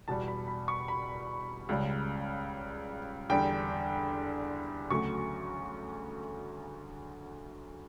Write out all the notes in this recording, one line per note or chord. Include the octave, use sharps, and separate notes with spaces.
E2 B2 G3 A5
B5
B5
C#6
B5
C#2 C#3 G3
E2 D3 G3 G5
D2 C#3 F#3 A3 C#6